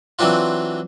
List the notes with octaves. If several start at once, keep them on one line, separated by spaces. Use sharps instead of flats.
E3 F#3 C4 D4 F4